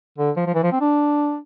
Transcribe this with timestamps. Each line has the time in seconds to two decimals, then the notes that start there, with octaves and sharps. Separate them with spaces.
0.18 D3
0.36 F3
0.46 F3
0.54 E3
0.63 F3
0.72 C4
0.81 D4